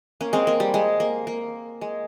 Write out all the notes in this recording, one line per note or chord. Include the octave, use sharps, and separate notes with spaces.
A#3 C#4
G#3 C4
A#3
G3
G#3
A#3
A#3
G#3